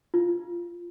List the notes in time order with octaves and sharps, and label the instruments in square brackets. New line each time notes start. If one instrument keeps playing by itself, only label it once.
[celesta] F4